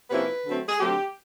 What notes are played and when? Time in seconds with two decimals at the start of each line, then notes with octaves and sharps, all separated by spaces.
0.11 C3 F3 A#3 C#4 E4 B4
0.45 D3 F#3 A3 C4
0.69 G#4
0.80 D3 F#3 A3 C4 G4